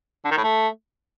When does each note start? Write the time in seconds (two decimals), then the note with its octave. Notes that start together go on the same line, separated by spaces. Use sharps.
0.25 D3
0.31 D#3
0.37 A2
0.44 A3